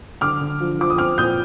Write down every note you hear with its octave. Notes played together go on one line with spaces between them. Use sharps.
D3 D6 F6
D3
F3
F3 D6
D#6
C4 D6 F6
A#2 D#6 G6